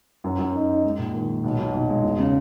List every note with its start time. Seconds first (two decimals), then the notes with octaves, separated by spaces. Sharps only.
0.24 F#2
0.39 F#2
0.54 D#4
0.69 D#4
0.84 G#3
0.99 A#1
1.14 D#3
1.29 A#1
1.44 B1
1.59 B1
1.74 B1
1.89 G#3
2.04 E1
2.18 C#3